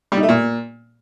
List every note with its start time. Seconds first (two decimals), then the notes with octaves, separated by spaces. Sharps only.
0.12 G3
0.17 D#4
0.23 A3
0.29 A#2